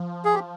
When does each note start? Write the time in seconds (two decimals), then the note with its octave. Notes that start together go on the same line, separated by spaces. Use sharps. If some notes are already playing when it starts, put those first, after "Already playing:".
Already playing: F3
0.25 G#4
0.34 G4